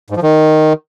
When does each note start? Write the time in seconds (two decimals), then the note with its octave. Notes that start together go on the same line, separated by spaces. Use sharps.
0.10 G#2
0.16 F3
0.23 D#3